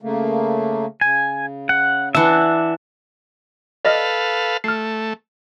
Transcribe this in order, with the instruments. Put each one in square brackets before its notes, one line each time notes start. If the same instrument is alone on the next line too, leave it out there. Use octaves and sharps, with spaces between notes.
[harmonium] C#3 A3 A#3
[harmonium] C#3 [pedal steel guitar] G#5
[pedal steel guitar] F#5
[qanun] E3 D4 [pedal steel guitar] E5 F#5
[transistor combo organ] A4 B4 F5 [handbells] D5 D#5 F6
[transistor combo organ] A3 [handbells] F6 C7